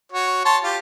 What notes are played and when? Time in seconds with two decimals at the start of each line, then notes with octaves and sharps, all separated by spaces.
0.12 F#4 C#5
0.45 C#5 A5 C6
0.64 F4 G4